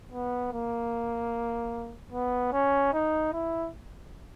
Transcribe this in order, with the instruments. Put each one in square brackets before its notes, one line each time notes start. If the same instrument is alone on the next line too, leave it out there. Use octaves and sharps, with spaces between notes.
[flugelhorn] B3
A#3
B3
C#4
D#4
E4